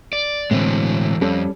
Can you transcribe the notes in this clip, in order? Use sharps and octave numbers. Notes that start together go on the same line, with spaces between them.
D5
A2 D3 E3 G#3 C4
F2 G3 C#4 A4